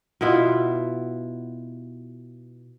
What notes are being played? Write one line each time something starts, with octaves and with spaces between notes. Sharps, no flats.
B2 B3 E4 F4